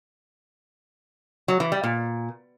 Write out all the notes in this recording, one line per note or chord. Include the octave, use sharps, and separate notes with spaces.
F#3
E3
G3
A#2